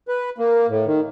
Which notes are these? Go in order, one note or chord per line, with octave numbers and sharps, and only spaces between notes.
B4
A#3
A2
D#3